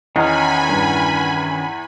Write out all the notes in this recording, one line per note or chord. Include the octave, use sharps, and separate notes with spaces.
E2 D#3 C#4 D#5 G#5 B5
G2